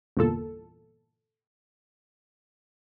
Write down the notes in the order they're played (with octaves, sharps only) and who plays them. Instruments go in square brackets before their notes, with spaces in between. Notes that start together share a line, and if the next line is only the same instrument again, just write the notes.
[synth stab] G1 E2 A#2 A4